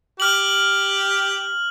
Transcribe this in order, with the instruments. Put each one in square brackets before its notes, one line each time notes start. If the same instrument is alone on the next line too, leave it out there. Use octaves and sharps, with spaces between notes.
[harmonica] G4 [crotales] F6 F#7